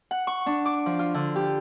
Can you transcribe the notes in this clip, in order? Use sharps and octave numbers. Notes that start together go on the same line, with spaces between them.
F#5
C#6
D4
D6
F3
F4
D3
G4